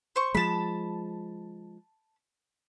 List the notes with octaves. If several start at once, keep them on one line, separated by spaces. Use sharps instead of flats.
C5 C#6
F3 G#3 A5 B5